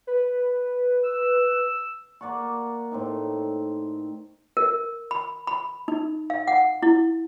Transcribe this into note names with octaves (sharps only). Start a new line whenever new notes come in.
B4
E6
A#3 D5 F#5 C#6
A2 C4 D#4
A#4
B5
B5
D#4
F5
F#5
E4